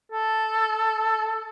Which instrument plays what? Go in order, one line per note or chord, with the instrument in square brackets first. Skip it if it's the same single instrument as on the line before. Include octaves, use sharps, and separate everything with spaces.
[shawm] A4